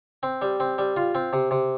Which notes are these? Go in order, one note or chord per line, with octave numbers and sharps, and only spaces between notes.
C4
G3
C4
G3
F4
C4
C3
C3